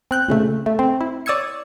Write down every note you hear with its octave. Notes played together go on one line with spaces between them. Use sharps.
C4 F#6 G6
A#2 C#3 A3
A3
C4
E4
C#5 D5 D#6 E6 G#6 C#7